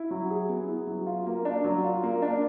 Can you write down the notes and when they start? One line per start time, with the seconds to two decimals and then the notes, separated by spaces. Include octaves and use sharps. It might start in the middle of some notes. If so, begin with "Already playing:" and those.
Already playing: E4
0.11 F#3
0.30 G#4
0.49 B3
0.68 E4
0.87 F#3
1.06 F4
1.27 A#3
1.45 D4
1.64 F#3
1.84 F4
2.03 A#3
2.22 D4